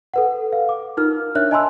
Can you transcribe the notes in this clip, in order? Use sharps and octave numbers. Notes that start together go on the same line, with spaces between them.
A4 B4 F#5
F5
D6
D#4 F4 A#4 F6
D4 A#4 C#5 E5 F#6
D#5 G#5 A5 B5 C6 E6